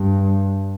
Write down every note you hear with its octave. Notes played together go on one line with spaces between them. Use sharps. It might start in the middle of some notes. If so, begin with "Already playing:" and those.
Already playing: G2